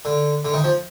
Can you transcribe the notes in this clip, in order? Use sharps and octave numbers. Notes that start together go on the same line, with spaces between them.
D3
D3
D#3
F3